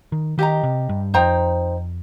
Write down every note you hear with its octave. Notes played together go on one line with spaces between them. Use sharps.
D#3
D#3 G4 D#5 A#5
C3
G2
F2 D#4 C5 G5 A#5